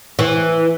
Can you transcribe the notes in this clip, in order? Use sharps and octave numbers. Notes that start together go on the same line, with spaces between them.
E3